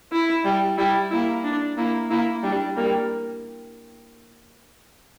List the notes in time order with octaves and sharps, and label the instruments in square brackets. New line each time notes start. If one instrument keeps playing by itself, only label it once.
[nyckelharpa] E4
[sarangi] G3
[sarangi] G3 [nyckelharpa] E4
[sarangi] A#3 [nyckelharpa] E4
[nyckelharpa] D4
[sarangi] A#3 [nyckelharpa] E4
[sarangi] A#3 [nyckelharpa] E4
[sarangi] G3 [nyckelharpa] D4
[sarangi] G3 [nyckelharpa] A#3